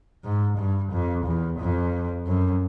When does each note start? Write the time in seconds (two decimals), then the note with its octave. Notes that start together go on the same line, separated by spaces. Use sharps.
0.24 G#2
0.58 G2
0.92 F2
1.26 E2
1.60 F2
2.26 F#2